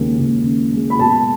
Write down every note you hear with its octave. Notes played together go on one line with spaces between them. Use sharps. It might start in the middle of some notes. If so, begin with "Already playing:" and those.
Already playing: D#2 C#3 G#3
D#2
C#3
G#3
B5
B2 A5